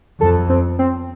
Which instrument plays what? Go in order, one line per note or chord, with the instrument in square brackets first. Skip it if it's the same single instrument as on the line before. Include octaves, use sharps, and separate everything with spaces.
[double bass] F2 [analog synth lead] A4
[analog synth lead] C4
C4